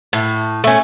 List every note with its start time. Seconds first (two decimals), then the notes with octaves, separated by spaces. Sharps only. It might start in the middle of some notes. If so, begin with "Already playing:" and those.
0.13 A2
0.64 A3 C#4